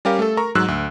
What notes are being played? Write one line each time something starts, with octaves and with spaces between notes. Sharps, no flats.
G3 C#4 G4 A#4 F5
A3 A4
A#4 A#5 C#6
G#2 F#3 E6 F#6
D2